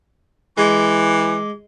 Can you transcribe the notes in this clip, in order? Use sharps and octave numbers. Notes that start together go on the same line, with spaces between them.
E3 G#3 D6